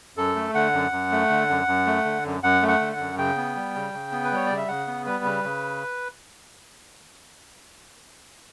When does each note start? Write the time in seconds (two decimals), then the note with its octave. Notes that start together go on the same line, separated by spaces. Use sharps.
0.17 F#2 A4
0.36 A3
0.55 D3 F#5
0.73 F#2
0.92 F#2
1.12 A3
1.29 D3
1.49 F#2
1.67 F#2
1.86 A3
2.05 D3
2.25 F#2
2.43 F#2 F#5
2.62 A3
2.68 F#5
2.80 D3
2.93 F#5
2.99 F#2
3.18 C#3 G5
3.37 B3
3.56 G3
3.75 C#3
3.93 C#3
4.12 B3
4.24 B4
4.32 G3 C#5
4.46 C#3 D5
4.57 E5
4.68 C#3 F#5
4.87 B3
5.06 G3 B4
5.24 C#3
5.44 C#3